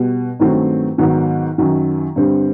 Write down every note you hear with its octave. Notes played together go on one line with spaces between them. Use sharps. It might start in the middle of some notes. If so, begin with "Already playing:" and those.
Already playing: B2 G3 B3
G2 D#3 F#3 A3 C4
G#2 D#3 F#3 B3
F#2 D#3 F#3
G2 D3 G3 C4